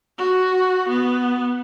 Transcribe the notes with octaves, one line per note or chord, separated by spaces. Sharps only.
F#4
B3